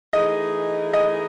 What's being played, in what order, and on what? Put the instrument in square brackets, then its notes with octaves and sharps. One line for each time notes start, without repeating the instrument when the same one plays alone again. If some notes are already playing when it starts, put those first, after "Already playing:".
[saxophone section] E3 A3 D#4 G#4 [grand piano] D#5
[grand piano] D#5